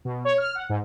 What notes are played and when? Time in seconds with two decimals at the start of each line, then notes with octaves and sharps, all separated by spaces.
0.05 B2
0.25 C#5
0.38 F6
0.55 F#5
0.69 G#2